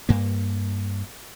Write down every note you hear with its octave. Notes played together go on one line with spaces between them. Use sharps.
G2 A#3